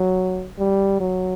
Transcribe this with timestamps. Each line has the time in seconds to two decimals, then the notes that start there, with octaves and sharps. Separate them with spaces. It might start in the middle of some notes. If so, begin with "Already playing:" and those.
Already playing: F#3
0.59 G3
1.00 F#3